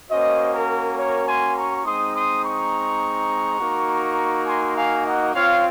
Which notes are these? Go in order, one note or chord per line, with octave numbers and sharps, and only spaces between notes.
A#3 C#4 F#4 C5 D#5
A#4
A#4 C#5
G#5 C6
A#5 C#6
G#3 C4 D#4 C6 D#6
C6 D#6
A#5 C#6
A#3 D#4 F#4
G#5 C6
F5 G#5
D#5 F#5
C4 F4 C#5 F5